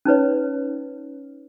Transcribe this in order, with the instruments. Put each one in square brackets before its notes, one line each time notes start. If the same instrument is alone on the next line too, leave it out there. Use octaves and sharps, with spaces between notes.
[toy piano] C#4 D#4 B4 C#5